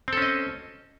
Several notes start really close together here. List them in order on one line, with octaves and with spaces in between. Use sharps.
C4 A4 C#4 D#5